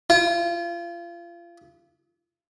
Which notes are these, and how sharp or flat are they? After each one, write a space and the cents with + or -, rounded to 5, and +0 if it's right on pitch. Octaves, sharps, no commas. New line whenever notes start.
F4 -30